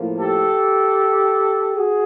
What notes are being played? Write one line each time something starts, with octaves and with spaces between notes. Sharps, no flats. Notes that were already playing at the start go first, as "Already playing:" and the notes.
Already playing: A2 F3 A#3
G4 A4
F#4 G#4